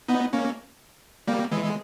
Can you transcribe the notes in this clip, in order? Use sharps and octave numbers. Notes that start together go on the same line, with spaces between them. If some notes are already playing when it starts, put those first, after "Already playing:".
B3 D#4
A#3 C#4
G3 A#3
E3 G#3
G#3